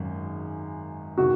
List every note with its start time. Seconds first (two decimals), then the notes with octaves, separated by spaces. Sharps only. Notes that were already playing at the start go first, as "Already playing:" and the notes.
Already playing: G#1 F#2 D#3 G#3
1.18 C3 D#3 F#4